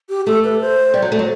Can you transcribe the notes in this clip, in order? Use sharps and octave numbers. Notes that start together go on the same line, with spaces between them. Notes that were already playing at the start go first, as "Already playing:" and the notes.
G4
A3 A4
B4
C5
G3
F#3
A3
F#3